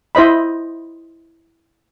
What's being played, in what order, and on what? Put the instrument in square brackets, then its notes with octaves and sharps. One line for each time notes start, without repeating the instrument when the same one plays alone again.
[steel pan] E4 C5 D#5 B5